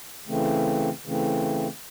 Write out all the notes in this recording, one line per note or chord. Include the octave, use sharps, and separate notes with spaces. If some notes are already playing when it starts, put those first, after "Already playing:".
C#3 E3 A3 C4
C#3 E3 A3 C4